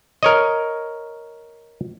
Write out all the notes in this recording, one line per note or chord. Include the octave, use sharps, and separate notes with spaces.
A#4 C#5 D#5